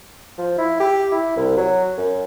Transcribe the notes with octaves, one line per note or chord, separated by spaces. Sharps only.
F3
E4
G4
E4
C2
F#3
F#2